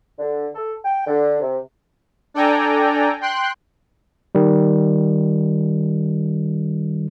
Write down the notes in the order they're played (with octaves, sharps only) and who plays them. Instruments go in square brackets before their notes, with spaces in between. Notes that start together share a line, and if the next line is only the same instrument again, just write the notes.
[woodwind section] D3
A4
G5
D3
C3
[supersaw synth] D4 A4 D5 G5 G#5 A#5
G5 C6 F#6
[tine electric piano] D#3 G3